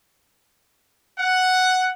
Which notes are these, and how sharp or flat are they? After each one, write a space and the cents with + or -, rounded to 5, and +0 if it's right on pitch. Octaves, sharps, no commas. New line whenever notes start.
F#5 +0